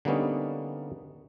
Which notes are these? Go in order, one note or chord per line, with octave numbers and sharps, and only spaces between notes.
D3 G3 A#3 B3 C#4 D#4